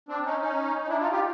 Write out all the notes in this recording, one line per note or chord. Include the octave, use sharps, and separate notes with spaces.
C4 D4
C#4 D#4
C#4 D#4
D#4
D4 E4
D#4 F4
F4 G4